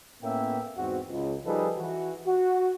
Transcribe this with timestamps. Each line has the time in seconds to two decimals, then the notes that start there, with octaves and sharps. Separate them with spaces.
0.23 A2 A#3 B3 C#4 E5 G5
0.77 E2 G#2 C4 F#4
1.09 C#2
1.46 F3 G3 D#4 G#4 A4 B4
1.78 E3 F#4
2.26 F#4